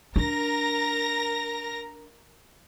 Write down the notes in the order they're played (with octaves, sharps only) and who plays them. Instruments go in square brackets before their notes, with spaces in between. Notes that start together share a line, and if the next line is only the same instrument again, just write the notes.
[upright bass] D4 [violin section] A#4 A#5 A#6